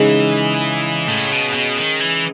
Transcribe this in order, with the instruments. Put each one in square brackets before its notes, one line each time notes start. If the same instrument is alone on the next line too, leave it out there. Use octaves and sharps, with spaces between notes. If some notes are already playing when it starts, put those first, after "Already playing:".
Already playing: [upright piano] C#3 G#3 D#4 [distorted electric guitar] E3
[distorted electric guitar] A2
B2
B2
D#3
E3